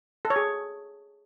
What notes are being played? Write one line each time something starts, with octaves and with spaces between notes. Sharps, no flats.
A4
C#5
G#4